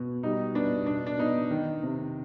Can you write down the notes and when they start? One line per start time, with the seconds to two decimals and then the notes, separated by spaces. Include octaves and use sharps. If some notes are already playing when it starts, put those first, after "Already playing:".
Already playing: B2
0.23 G3 D#4
0.55 B3 D4
0.86 B2 D4
1.07 D4
1.19 B3 D#4
1.51 D#3
1.83 C3